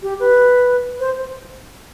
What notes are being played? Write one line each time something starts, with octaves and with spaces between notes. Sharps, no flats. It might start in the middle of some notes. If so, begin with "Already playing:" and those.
G4
B4
C5